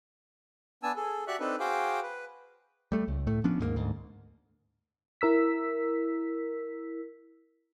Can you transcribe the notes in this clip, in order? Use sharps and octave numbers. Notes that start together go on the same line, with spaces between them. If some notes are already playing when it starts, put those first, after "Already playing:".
B3 D4 G#5 A5 E6
G#4 A4
F#4 G4 D5 E5 C#6 F#6
C4 D4 D#4 A4 B4
F#4 G#4 C5 F5 G5 D6
B4
G3 A3
C#2
A2 A3
F3 B3 C#4 D4
D#2 G#2 G#3 A#3
D2 G#2
E4 A#4 E6 B6